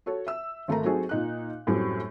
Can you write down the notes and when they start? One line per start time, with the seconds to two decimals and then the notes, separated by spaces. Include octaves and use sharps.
0.06 F#4 A4 C#5
0.27 E5 E6
0.68 G#1 A3 A#4 A#5
0.84 F#3 C4 D#4 F#4 G#4 A4
1.09 A#2 D#4 F#6
1.67 F#2 A2 F#3 G3 C4 F#4